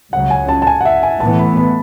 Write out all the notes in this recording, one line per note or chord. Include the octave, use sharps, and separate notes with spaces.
C#2 C#3 F#3 F#5
G#5
A5
A5
G#5
F#5
E5
G#5
A2 E3 B3 A5
B5
B5